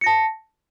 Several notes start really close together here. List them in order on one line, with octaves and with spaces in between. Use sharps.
C#7 A#6 A5